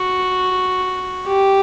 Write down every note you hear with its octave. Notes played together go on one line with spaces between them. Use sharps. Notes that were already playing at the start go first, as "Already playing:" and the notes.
Already playing: F#4
G4